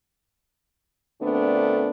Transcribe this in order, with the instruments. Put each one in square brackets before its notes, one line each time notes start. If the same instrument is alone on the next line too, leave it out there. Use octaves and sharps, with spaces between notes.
[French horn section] A#2 D3 A3 B3 C4 D4